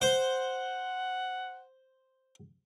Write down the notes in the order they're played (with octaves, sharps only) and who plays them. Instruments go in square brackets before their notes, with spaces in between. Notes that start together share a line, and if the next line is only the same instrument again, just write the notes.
[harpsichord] C5 [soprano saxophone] F#5